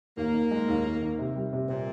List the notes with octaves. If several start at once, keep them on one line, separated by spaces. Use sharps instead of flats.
D#2 A#3
D#3
G#3
D#2
D#2
D#3
C3
G3
C3
A#2 C4